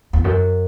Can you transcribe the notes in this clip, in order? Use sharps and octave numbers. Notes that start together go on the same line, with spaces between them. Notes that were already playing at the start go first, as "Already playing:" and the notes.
E2
F#2